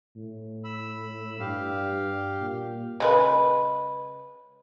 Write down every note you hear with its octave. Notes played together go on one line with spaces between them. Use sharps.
A2
B5 E6
G2 G4 F5
A#2
C#3 G#3 B4